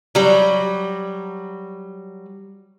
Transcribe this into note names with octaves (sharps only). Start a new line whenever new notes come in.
F#3 G3